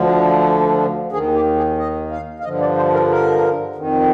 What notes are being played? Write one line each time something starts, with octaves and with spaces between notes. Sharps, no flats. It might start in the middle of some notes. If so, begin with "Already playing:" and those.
Already playing: D2 D3 F3
D#2 D#3 G#4
G4
G#4
D#5
F5
F5
G2 D3 F3 D#5
D5
C5
A#4
A#4
F2 D#3